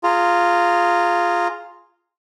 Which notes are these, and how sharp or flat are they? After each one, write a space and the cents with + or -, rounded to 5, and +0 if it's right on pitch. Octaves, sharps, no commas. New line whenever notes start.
F4 +0 G#4 +0 A#5 -20